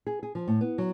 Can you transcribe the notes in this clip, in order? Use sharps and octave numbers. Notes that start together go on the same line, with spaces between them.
G#4
G#4
F3
A2
B3
F#3